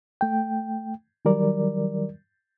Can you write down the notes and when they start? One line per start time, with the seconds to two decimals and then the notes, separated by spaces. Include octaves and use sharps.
0.21 A3 G5
1.25 D#3 F#3 G3 A#4 D5